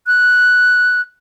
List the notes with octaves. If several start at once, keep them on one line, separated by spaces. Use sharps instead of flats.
F#6